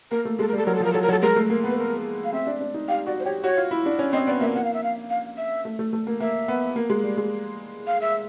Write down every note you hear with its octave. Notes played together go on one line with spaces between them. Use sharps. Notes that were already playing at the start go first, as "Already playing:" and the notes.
A#3 A#4
A3
G#3 A4
A#4
G3 A4
F#3 A#4
A4
F3 A#4
F#3 A4
A#4
F#3 A4
G#3 A#4
A3
A#3
B3
B4
A#4
F5
C4 E5
D4
D4
D#4
G4 F5
F#4 D5
C5
G4 C#5
F#4 C#5
F4
E4
D4
C#4
C4 D#5
B3 D5
A#3 E5
A#3 F#5
F5
E5
F5
F5
E5
A3
A3
A3
A#3
A#3 E5
B3
A#3
G#3
G3
G#3
F5
E5